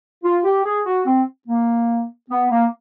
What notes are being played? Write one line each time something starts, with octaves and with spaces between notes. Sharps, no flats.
F4
G4
G#4
F#4
C4
A#3
B3
A#3